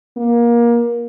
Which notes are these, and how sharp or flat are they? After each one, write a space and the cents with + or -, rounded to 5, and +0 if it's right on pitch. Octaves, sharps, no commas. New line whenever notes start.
A#3 +20